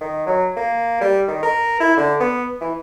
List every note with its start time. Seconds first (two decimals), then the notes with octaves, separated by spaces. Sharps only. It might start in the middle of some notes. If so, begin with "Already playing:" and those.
0.01 D#3
0.26 F#3
0.57 A#3
1.01 G3
1.28 D#3
1.43 A#4
1.80 E4
1.97 D3
2.20 B3
2.61 E3